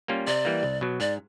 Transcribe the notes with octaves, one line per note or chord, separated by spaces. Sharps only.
G3 A#3 C#4 F4
C3 D5
E3 G3 A#3
C2
B2 F#3
G#2 D5